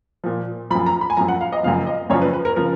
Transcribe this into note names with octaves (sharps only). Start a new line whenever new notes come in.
A#2 F3
F#2 F3 B5
A#5
B5
G#5
F#2 F3 A#5
F#5
F5
D#5
F#2 C#3 F3 F5
D#5
F#2 C#3 F3 C#5
B4
B4
A#4
C#3 F3 A#4